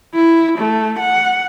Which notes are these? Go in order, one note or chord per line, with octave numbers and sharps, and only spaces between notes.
E4
A3
F#5